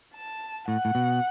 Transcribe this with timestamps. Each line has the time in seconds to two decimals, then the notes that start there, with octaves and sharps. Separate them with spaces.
0.15 A5
0.68 A2 F#5
0.85 A2
0.95 B2